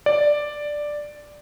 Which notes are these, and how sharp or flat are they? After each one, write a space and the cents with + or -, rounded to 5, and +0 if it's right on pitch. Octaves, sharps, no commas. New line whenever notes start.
D5 +5